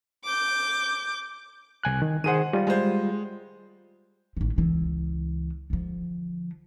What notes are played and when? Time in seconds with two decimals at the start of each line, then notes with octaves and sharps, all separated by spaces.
0.25 D6 G6
1.83 C2 G#5 F#6
2.02 D#3
2.24 D#3 G#4 C5 F#5 D#7
2.53 G3 F4
2.67 G#3 C5
4.37 A1 D#3
4.56 C#2 E3
5.70 D3 F3